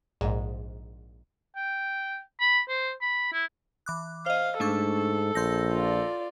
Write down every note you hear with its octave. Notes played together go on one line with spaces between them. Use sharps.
A#1 G#2
G5
B5
C5
B5
E4
E3 D6 F#6
C5 D#5 F5
G#2 A3 D4 A4 C#6
A#1 C6 G6 A#6
F4 D5